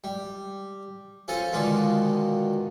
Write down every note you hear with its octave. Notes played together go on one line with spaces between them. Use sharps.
G3
C#4 F4 A4 C5 G#5
B2 D3 D#3 G#3 D4 F4